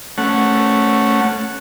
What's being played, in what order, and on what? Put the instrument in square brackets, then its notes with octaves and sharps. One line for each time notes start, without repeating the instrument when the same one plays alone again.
[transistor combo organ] A3 C#4 F#5